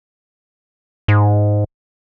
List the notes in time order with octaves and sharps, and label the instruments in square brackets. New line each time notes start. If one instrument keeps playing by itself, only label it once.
[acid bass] G#2